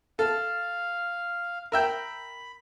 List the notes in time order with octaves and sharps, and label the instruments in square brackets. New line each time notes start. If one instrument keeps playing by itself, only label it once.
[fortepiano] A4 [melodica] F5
[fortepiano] A#4 E5 G5 [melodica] B5